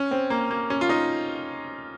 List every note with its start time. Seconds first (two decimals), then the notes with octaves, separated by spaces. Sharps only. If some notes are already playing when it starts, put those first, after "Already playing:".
Already playing: C#4
0.11 C4
0.30 A#3
0.51 A#3
0.70 C#4
0.81 F4
0.89 D#4